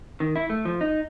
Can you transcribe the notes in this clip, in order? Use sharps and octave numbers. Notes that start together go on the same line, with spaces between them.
D#3
E4
A3
F3
D#4